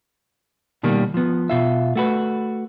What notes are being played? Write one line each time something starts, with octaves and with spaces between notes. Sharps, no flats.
B2 D#3 G3 A#3
F3 B3
B2 F4 E5
A3 F#4 B4